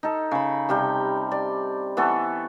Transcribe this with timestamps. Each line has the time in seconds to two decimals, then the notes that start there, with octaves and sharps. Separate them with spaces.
0.03 D#4 A4
0.31 C#3 B5
0.69 C3 G3 G5
1.32 D5
1.97 E3 B3 A4 C#6